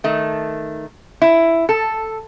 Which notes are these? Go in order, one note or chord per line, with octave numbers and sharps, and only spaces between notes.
D#3 A3
E4
A4